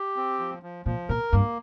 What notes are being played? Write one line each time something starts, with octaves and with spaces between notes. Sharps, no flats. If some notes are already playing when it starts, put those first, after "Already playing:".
Already playing: G4
C4
F3
F3
A#2 F3
A#2 A#4
G2 A#3